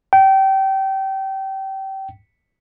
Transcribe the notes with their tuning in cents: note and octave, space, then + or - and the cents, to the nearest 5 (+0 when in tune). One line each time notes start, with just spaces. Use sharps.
G5 -25